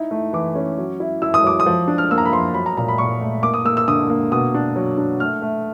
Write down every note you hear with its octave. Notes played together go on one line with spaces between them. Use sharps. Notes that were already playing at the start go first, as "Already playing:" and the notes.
Already playing: D#4 E4
A3
E3 D6
C#4
F#3
E4
E4 E6
D#6
F#3 D6
D#6
F3
D4
F6
A#3 E6
A#5
B5
F3 C6
F#3 B5
A#5
A#2 A#5
B5
A#2 C#6
A3
A#3 D6
D#6
A#3 E6
E6
D3 D#6
A#3
B2 D#6
D4
F#3
D4
A3 F6
A3